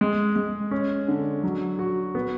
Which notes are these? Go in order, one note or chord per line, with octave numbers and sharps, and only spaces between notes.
G#3
G#3
C#4
D3
F#3
F#4
B3